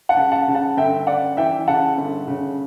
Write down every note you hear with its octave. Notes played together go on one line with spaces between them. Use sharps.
F#5 A5
C#2
F#5 A5
C#3
F#5 A5
G1 E5 G5
F#2 D5 F#5
E3 E5 G5
C#3 F#5 A5
G1
C#3